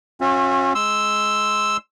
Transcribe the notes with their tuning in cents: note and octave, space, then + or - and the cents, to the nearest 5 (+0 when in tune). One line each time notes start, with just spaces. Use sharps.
C#4 -30 F#4 -45 E5 +0
G#3 +10 C6 -5 E6 +0